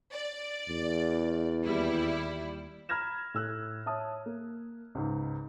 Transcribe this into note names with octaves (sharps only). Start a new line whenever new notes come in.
D5
E2
D#2 G3 E4
A#5 B5 F6 G#6 A#6 E7
A2 E6 F#6
C#5 E5 A5 D#6
A#3
C#2 G#2